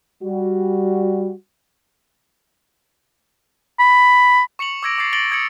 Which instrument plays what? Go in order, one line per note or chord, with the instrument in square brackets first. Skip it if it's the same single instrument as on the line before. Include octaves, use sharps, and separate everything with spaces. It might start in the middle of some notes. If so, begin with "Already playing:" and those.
[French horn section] G3 F#4
[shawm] B5
[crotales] C#6 C#7 F7 F#7
D6 E6 G#6 A#6 D7
D6 G#6 A6 C7
A6 A#6 D7 F#7 G7
D#6 G#6 A6 C#7 F#7